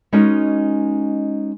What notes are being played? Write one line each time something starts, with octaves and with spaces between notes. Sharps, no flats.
G#3 C#4 D#4 F#4 A#4